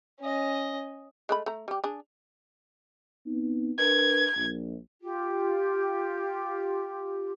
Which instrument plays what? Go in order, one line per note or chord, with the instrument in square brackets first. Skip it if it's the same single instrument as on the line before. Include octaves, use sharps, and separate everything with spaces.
[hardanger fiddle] C#4 D#5
[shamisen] G#3 A3 B5
A3 A#5
G3 G4
D4 G#4
[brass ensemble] B3 C4 D#4
[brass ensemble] D4 A#4 B4 [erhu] G#6
[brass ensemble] A#1
[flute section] F4 G4